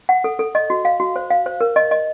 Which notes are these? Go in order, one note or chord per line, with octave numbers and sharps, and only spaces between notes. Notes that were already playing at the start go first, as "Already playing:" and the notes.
F#5
A4
A4
D#5
F#4
F5
F#4
C5
F5
C5
A#4
D#5
D#5